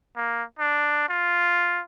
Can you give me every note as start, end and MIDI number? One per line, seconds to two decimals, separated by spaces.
0.16 0.43 58
0.59 1.07 62
1.09 1.82 65